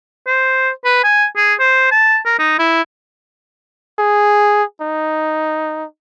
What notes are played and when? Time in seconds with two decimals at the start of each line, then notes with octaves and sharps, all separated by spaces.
0.27 C5
0.85 B4
1.04 G#5
1.37 G#4
1.60 C5
1.91 A5
2.26 A#4
2.39 D#4
2.59 E4
3.99 G#4
4.81 D#4